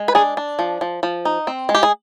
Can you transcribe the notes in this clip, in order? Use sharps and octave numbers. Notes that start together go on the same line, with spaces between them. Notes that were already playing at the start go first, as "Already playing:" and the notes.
Already playing: G#3
B4
D4 G#4
D4
F3
F3
F3
D#4
C4
G#3
G4
G#4